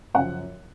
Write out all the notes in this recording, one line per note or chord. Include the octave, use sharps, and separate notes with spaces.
F#2 C#3 F3 F#5